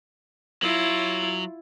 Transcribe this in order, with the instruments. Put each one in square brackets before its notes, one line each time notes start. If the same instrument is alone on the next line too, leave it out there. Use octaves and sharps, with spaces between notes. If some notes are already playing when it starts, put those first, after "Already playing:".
[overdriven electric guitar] F#3 [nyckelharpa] E4 F4